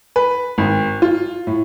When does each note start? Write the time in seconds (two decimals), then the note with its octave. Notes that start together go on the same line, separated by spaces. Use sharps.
0.16 B4
0.58 G#1
1.02 F4
1.47 A2